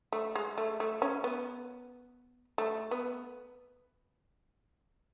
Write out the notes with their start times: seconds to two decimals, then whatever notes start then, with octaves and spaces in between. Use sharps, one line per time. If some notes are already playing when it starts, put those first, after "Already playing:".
0.13 A3
0.35 G#3
0.58 A3
0.80 A3
1.02 C#4
1.24 B3
2.58 A3
2.91 B3